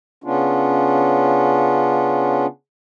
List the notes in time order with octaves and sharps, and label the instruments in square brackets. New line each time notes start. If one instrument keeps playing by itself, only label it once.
[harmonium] C#3 B3 C#4 D4 F4